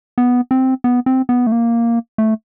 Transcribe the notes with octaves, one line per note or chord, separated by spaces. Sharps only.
B3
C4
B3
C4
B3
A3
A#3
A3